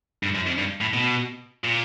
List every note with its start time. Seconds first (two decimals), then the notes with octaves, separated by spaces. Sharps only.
0.23 G2
0.35 F#2
0.46 F2
0.58 G2
0.81 A2
0.94 B2
1.64 A#2